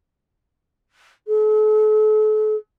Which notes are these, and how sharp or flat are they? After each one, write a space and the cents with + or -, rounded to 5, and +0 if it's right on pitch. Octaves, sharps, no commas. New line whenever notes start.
A4 -40